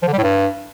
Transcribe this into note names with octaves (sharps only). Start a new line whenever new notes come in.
F3
D3
G3
A2
G2